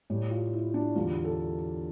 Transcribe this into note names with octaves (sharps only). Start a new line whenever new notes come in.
A2 G3 G4
F4
E4
D4
E2 D3 G3 F4
A4